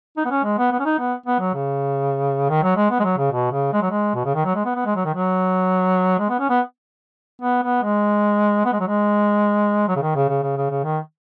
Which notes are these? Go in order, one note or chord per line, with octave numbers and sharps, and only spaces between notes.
D#4
B3
C#4
G#3
B3
B3
C#4
D#4
B3
B3
F#3
C#3
D#3
F#3
G#3
B3
G#3
F#3
C#3
B2
C#3
G#3
F#3
G#3
B2
C#3
D#3
F#3
G#3
B3
B3
G#3
F#3
D#3
F#3
G#3
B3
C#4
B3
B3
B3
G#3
B3
G#3
F#3
G#3
F#3
C#3
D#3
C#3
C#3
C#3
C#3
C#3
D#3